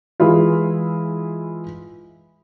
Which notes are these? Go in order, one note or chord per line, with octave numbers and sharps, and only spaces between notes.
E3 G#3 E4 F4